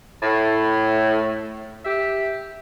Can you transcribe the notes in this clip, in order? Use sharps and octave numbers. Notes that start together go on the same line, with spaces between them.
A2
G4 E5